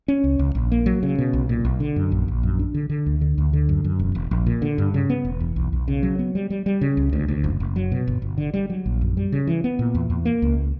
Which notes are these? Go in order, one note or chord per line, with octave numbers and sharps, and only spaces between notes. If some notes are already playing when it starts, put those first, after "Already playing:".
C#4
C#2
C#2
A#1
A#3
F#3
C#3
B2
B1
A#2
B1
D3
F#2
A#1
A#1
F#2
D4
D3
D3
D2
D3
D2
D3
F#2
F#2
E1
E1
A#1
A#2
D3
G2
C#3
B3
E1
E2
B1
B1
C#3
F#3
B3
G3
G3
G3
C#3
C#2
D2
D2
F#1
F#1
F#3
B2
G1
G1
D3
G3
F#3
A#1
F#2
G3
C#3
E3
B3
A#2
E2
E2
A#3
C#2